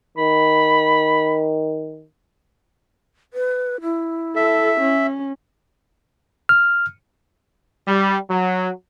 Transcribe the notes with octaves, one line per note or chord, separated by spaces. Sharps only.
D#3 B5
B4
E4
A4 E5
C#4
F6
G3
F#3